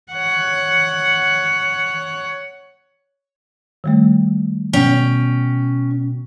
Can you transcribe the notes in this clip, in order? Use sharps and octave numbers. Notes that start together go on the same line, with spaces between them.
C#5 F#5
D#3 G3 A3
B2 C#4 G5